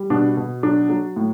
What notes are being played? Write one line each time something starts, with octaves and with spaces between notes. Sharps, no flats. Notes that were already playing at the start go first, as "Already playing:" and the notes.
Already playing: G3
B2 D4
B2
F#3 D4
F#3
A2